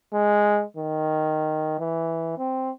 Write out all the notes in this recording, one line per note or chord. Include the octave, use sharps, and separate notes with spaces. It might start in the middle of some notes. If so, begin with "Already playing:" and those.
G#3
D#3
E3
C4